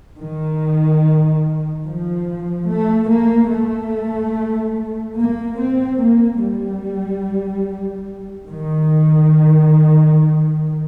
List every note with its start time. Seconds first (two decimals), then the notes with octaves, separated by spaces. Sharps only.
0.19 D#3
1.85 F3
2.68 A3
3.09 A#3
3.50 A3
5.16 A#3
5.58 C4
5.99 A#3
6.41 G3
8.48 D#3